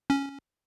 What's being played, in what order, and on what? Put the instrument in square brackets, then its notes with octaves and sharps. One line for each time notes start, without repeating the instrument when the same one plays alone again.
[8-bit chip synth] C#4